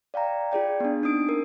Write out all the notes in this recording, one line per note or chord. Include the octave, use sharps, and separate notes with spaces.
D5 F5 G5 A#5
F4 G#4 D5 G5
B3 D4
C4 D4 D#4 D#6 D7
A#4